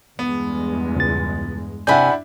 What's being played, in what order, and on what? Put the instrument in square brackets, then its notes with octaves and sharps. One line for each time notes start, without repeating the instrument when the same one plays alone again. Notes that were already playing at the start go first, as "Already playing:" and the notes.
[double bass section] E2 G2 G#3 [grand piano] B3
[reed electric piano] C#2 A6
[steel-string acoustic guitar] C3 G#5 [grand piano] D4 E4 [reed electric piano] F#5 B5 G6